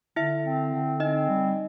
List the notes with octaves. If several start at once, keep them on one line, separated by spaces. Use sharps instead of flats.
D3 E4 E5
C4
D3
C4 D#4 D#5
G3